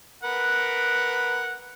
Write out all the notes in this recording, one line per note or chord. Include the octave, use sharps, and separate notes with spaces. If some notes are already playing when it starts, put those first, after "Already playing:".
A#4 B4 F#5